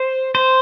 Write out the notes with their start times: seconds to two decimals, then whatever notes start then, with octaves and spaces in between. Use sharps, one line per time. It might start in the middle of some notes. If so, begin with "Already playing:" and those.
Already playing: C5
0.35 C5